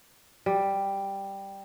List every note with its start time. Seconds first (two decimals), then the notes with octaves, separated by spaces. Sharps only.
0.46 G3